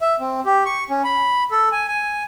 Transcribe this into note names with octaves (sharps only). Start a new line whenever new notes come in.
E5
C4
G4
C#6
C#4
B5
A4
G#5
G#5